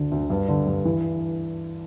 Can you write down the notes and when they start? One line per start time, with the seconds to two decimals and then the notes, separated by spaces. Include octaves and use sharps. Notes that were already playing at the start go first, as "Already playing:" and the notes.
Already playing: D2 D3
0.11 D2
0.30 G2
0.49 D3
0.67 G2
0.85 E3